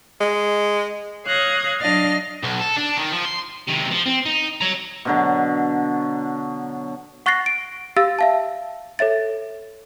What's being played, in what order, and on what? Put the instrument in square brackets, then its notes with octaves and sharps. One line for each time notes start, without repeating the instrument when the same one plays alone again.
[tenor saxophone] G#3
[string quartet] C#5 F5 D#6 F#6 G#6 A#6
F#3 D4 D#5 F5 F6 A6
[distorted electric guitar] B1
A4
D4
D#3
F3
C6
C3 D#3
F3
C4
D#4
C#5 A#5
[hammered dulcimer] B2 D3 F#3
[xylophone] F#5 C#6 F#6 A6 A#6 C7
D7
G4 F5 E6 A6
E5 F5 A5
A4 C#5 E5 A6